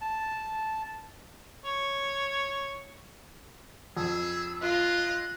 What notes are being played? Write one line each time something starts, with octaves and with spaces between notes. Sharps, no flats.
A5
C#5
F2 G#4 E6
F4 D#5 F#6